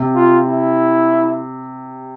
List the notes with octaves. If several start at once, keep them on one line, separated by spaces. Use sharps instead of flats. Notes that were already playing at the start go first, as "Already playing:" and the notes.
Already playing: C3
F4
E4